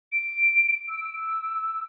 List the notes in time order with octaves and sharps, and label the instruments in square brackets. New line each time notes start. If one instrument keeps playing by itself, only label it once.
[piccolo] D7
E6